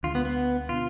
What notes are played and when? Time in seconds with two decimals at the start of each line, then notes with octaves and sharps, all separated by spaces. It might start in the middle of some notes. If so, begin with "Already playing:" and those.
0.03 D2 D3 G#3 F4
0.15 B3
0.25 B3
0.69 B2 B3 D4 F4